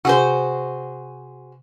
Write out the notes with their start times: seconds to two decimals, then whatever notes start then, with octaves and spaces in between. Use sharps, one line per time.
0.05 C3 F#4 G#4 C5